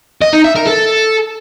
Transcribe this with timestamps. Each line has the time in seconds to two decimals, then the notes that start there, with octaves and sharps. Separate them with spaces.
0.22 D#5
0.33 D#4
0.44 E5
0.55 A#4
0.67 A4